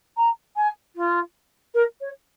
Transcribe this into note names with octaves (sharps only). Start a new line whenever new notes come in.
A#5
G#5
F4
A#4
C#5